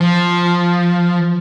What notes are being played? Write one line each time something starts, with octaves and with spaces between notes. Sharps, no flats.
F3